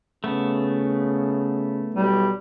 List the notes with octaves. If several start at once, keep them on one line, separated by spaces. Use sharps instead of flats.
C#3 A3 B3
B1 G3